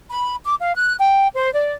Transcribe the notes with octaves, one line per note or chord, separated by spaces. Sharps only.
B5
D6
F5
F#6
G5
C5
D5